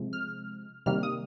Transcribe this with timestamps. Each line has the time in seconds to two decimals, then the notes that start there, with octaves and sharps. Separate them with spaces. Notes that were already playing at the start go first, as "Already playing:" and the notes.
Already playing: C3 F3 G#3
0.13 F6
0.86 C3 D#3 G3 A#3 F6
1.03 D#6